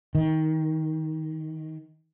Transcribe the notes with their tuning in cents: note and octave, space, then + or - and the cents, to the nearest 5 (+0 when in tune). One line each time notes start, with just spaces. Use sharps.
D#3 +20